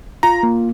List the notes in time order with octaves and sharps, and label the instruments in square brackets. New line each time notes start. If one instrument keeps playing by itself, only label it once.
[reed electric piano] F4 [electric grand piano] A#5
[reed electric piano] A#3